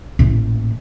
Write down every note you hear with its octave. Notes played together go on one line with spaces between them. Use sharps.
A1 A#2